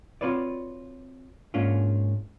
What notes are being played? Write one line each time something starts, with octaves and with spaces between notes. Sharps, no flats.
C4 F4 F#4 B4 C#5 D5
G#2 A#3 C#4 D4 F4